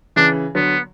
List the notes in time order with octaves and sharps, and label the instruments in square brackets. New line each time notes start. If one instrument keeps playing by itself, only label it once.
[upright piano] C#3 E3 [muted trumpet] D4
[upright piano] D3 F#3 [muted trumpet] B3